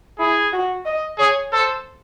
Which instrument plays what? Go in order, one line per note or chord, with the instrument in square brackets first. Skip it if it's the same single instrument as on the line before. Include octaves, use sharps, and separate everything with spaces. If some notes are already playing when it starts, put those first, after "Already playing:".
[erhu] E4 [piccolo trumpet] G#4
[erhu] F#4
D#5
[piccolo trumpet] G#4 [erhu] C#5
[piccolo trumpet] A4 [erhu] C5